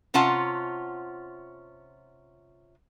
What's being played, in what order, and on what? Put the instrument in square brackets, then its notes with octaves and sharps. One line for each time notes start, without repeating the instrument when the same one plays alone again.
[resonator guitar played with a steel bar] C3 C#4 F4 F#5 A5